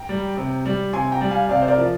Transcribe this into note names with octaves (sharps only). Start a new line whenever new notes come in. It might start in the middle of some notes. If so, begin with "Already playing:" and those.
Already playing: G5 A#5
G3
C3
G3
C3 G#5 C6
G5 A#5
G3
F5 G#5
C3 D5 F5
C5
A#4 D5
F3